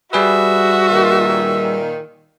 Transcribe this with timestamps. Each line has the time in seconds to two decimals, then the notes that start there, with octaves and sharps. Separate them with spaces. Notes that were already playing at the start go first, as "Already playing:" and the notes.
0.13 G3 F#4 G#4 B4 E5
0.90 A#2 D#3